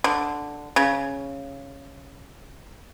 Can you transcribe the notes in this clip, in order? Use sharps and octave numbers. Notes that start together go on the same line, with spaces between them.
D3
C#3